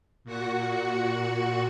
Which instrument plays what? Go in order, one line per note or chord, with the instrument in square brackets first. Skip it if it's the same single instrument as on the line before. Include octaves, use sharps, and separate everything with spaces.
[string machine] A#2 F#4 F#5